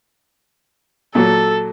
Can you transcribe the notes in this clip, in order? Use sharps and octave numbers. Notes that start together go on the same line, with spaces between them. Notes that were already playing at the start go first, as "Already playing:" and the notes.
A#2 F#3 A4